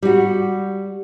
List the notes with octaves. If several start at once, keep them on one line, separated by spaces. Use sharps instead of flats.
G3 F#4